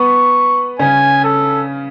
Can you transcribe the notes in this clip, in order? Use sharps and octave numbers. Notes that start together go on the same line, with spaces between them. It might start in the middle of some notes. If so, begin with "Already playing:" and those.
Already playing: B3 B4 C#6
C#3 C#4 G#5
A4